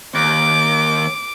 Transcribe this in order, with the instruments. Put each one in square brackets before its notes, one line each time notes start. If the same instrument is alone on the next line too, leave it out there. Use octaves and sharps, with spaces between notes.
[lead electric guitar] D#2 [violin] D6